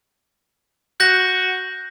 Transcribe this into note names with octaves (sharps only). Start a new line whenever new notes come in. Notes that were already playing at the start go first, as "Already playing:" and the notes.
F#4 G6 A#6